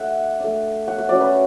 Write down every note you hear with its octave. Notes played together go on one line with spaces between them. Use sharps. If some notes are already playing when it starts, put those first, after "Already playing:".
Already playing: A3 D4 E5 F#5
A3 D4
F#5
E5
F#3 C#4 E4 D5
B4